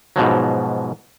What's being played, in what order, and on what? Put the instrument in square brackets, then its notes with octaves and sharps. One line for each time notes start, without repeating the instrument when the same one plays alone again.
[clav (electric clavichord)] G#2 B2 F3 F#3